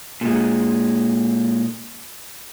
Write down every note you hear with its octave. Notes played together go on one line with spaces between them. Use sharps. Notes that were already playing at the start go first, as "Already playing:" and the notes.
A#2 G#3